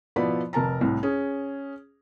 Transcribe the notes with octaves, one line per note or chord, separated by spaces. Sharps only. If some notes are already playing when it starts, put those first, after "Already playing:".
B2 F3 B3 E4 D5 B5
F1 A#4 A5 A#5
C2 A2
C#4 G#4